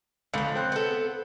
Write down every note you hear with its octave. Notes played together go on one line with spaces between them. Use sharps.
C#2 D3 F3
C4 F#6
B3 A4